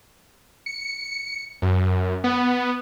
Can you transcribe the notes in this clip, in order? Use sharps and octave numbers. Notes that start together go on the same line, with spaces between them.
C#7
F#2
B3